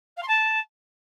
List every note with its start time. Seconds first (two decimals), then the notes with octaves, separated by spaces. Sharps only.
0.16 F5
0.22 C6
0.28 A5